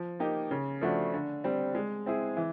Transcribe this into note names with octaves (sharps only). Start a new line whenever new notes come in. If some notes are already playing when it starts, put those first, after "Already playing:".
Already playing: F3
A#3 D#4 G4
C#3
F3 A3 D4 F#4
D3
G3 C4
G#3
C4 E4 G#4
E3